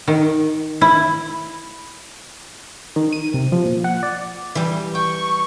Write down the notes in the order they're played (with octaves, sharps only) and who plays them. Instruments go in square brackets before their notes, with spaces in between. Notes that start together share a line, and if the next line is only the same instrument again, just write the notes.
[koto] D#3
E4
[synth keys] D#3
D#7
C3
F3
A#2
F#5
D5
[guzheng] E3 G3
[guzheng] G5 [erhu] C#6